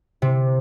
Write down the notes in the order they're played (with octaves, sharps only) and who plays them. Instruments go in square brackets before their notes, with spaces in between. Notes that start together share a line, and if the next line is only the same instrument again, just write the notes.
[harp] C3